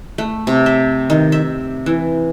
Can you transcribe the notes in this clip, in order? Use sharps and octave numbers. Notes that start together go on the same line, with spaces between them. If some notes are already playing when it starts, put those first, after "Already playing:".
A3
C3
E5
D#3
E5
E3